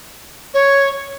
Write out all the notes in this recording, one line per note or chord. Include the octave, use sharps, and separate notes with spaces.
C#5